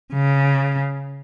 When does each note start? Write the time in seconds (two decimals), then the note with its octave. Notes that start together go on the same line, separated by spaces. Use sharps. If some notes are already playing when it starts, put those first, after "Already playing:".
0.13 C#3